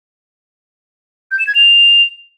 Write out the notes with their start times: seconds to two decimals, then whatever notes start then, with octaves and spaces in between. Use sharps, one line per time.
1.31 G6
1.39 E7
1.47 G#6
1.55 F7